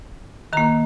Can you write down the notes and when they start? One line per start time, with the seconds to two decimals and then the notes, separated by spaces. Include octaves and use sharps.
0.53 D#3 A#3 A#5